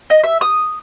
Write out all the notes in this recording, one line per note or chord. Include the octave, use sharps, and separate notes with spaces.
D#5
E5
D#6